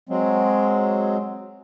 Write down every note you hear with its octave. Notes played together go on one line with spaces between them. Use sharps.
F#3 G#3 C4